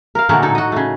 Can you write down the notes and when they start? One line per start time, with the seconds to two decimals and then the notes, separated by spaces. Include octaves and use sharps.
0.15 A#4 F5
0.29 A#2 D3 F#3 G#3 A3 A#4
0.42 A2 D#4 A4
0.55 F#4 D#5
0.72 C#3 A3